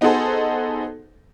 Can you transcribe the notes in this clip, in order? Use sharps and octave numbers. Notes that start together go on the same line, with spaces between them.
B3 D#4 F#4 G#4 A4 C5